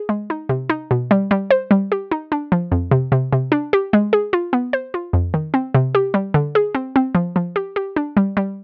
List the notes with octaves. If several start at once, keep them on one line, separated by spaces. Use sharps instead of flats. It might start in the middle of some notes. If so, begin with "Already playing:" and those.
Already playing: G#4
G#3
D#4
C3
D#4
B2
G3
G3
C5
G3
G4
D#4
D4
F3
F2
C3
C3
C3
D4
G4
G#3
G#4
F4
B3
C5
F4
F2
D#3
C4
C3
G4
G3
D3
G#4
C4
C4
F3
F3
G4
G4
D4
G3
G3